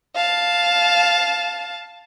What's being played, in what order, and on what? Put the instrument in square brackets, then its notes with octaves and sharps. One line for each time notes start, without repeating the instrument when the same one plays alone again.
[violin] F5 A5